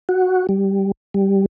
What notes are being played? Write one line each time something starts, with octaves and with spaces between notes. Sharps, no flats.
F#4
G3
G3